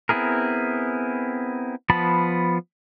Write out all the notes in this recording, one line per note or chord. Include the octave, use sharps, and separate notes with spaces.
B3 C4 E4 G#4 A#4
F3 B3 A5 B5